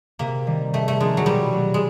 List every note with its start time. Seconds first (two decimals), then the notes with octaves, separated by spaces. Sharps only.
0.19 C3 A#3
0.47 D#3 G3
0.73 C3 A3
0.88 A3
1.00 F3 G#3 A#3 D4
1.17 F#3
1.26 B2 G3
1.53 F#3 A3
1.74 G#3